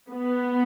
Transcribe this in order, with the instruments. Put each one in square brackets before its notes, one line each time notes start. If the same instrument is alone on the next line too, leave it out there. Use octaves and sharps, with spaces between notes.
[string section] B3